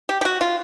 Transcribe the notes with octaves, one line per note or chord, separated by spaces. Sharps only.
G4
G4
F#4
F4